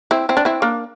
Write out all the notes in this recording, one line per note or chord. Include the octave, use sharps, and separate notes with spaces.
C4 E4
C4 E4
D4
C4 E4
A#3 D4